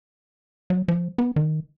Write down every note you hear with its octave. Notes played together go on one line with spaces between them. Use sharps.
F#3
F3
B3
D#3